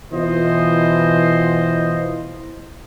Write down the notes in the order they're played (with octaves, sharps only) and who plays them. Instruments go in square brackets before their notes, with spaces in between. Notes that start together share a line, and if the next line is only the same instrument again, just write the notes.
[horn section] B2 E3 E4 F4 C5 D#5